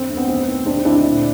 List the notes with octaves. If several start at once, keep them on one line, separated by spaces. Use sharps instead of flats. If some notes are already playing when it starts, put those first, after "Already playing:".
Already playing: F2 D3 C4
D2
B3
D#3 C4
D#3
D2 C4 D4
D2 D4 E4
A#1